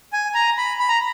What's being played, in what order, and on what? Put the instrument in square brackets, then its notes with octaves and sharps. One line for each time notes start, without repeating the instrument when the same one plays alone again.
[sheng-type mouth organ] G#5
A#5
B5
B5
A#5